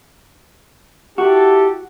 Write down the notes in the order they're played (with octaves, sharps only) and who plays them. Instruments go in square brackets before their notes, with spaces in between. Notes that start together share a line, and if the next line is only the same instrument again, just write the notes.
[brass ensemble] E4 G4 A4 [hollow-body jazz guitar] F#4